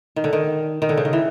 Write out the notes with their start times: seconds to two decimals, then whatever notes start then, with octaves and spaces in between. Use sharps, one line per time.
0.16 D#3
0.24 D3
0.33 D#3
0.82 D#3
0.89 D3
0.97 C#3
1.05 D#3
1.13 E3